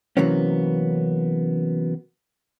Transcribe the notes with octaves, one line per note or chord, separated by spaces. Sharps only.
C3 E3 F#3 A#3 B3 C#4